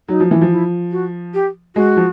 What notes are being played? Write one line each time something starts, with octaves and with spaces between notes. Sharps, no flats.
F#3 D#4
F3
E3
F3
E4
F#4
G4
G#3 F#4
F3